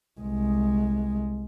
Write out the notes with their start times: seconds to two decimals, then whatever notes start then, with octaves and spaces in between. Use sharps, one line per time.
0.20 C2 G#3